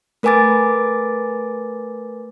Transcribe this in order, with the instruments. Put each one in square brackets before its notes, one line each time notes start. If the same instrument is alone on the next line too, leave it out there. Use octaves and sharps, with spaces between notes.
[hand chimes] A3 A#4 B4 G#5 D6 A6